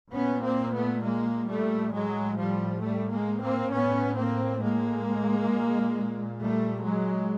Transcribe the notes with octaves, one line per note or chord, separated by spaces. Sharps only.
A#2 B3 C#4
A#3 C4
A3 B3
G#3 A#3
G3 A3
A2 F#3 G#3
F3 G3
G3 A3
G#3 A#3
A#3 C4
A2 B3 C#4
A#3 C4
G#3 A#3
A#2
G3 A3
F#3 G#3